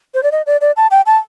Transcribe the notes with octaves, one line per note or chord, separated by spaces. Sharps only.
C5
D5
D#5
D5
D5
A5
G5
A5